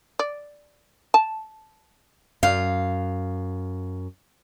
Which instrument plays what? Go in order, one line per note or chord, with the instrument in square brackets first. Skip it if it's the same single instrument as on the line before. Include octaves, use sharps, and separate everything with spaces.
[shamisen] D5
A5
[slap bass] F#2 [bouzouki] F5